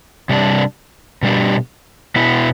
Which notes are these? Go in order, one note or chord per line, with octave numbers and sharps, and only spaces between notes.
C3 G3 D4
B2 G3 D4 G4
B2 B3 E4